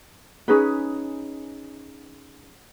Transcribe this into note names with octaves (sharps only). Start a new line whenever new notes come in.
C#4 D#4 G#4 B4